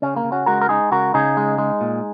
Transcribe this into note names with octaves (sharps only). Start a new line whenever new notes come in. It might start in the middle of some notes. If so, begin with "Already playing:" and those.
C#3 C#4
A#3
C#3
C#4 F#4
G#3 F#4 A#4
A#4
G#3 D#4 G#4
C#3 F#4 A#4
C#3 D#4 G#4
G#3
G#3
A#2